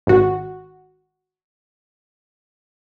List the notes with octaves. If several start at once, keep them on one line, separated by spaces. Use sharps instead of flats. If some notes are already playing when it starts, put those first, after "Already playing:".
G#1 F#4